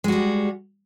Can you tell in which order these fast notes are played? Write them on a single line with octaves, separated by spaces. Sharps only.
G#3 F#4 G3